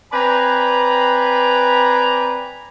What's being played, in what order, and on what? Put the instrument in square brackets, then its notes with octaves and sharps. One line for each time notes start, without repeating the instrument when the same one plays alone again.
[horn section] C4 B4 D5 G#5 A#5 B5